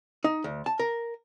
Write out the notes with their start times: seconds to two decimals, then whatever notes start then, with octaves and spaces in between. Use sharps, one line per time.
0.24 D#4
0.44 D2
0.66 A5
0.79 A#4